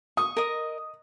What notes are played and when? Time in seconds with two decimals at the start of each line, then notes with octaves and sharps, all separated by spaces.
0.17 C#6 D#6
0.37 A#4 D#5